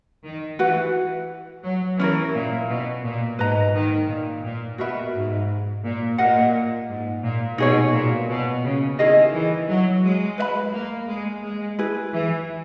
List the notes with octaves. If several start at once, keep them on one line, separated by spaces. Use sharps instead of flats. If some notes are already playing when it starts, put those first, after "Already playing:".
D#3
E3 F#4 B4 F#5
F#3
E3 C#4 E4 A#4
A#2
B2
A#2
G#2 B4 D#5 A#5
D#3
A#2
A#2
B2 F#4 A#4 E5 B5
G#2
A#2
A#2 A#4 D#5 F#5
G#2
A#2
B2 D#4 G#4 C#5
A#2
B2
C#3
D#3 E4 G#4 D#5
E3
F#3
G#3
B4 E5 B5
A#3
G#3
G#3
E4 G#4 B4
E3